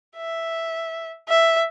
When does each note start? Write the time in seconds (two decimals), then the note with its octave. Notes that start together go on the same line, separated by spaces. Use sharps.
0.17 E5
1.29 E5